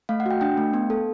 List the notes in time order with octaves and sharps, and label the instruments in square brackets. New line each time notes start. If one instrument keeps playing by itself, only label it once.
[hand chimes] A3 F5
F#5
F#4 G5
D4 G5
A3
B3
A4